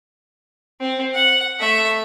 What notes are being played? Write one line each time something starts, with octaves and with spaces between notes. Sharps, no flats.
C4
F#5
A3 E5